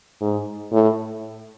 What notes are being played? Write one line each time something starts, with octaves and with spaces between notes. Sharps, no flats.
G#2
A2